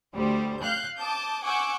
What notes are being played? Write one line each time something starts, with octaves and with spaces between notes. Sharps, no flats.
D2 G3 C5
F5 F#6 G6
A5 D6 D#6 G6
F#5 G#5 C#6 D6 E6 G6